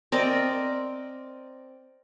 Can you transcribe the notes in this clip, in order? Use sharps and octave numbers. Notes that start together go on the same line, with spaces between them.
C4 A#4 D5 D#5